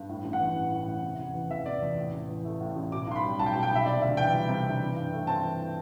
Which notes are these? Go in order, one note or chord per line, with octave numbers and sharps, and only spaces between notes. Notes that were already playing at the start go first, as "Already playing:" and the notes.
Already playing: G2
A2
A1
F#5
E3
A1
A2
A1
C3
E2
E3
E2 E5
C3 D5
E2
A2
A1
E3
A3
A2
A1
B2 D6
B1 C6
B5
G3
B1 A5
G5
B2 A5
G5
B1 E5
C3 D5
D2 E5
E3 G5
G3
C3
D2
E3
G2
A3
C4 A5
E3